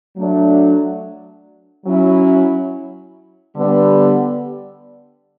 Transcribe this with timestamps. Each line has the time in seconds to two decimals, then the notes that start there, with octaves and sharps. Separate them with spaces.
0.16 F#3 A3 D4
1.85 F#3 C#4 E4
3.55 D3 G3 B3